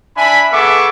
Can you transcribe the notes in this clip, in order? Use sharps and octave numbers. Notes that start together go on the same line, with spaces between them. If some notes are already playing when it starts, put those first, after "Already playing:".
D4 E5 G#5 B5
B3 G#4 A4 E5 C#6 D6